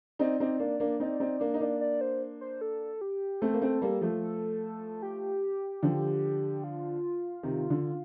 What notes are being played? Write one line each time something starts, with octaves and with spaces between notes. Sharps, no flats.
C4 D#4 D5
C4 D#4
A#3 D4
A#3 D4
C4 D#4
C4 D#4
A#3 D4
D#4
A#3 D4
D5
C5
C5
A4
G4
A3 C4 A4
A#3
A3 C4
G3 A#3
F3 A3
G4
D3 F3
F4
C3 D#3
D3